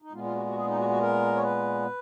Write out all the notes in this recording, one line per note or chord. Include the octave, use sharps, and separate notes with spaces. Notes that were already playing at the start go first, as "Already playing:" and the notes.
D#4
A#2 G#3 B3 F4
F4
F#4
F#4
G#4
D#4
F#4
F#4
A#4
C#5
B4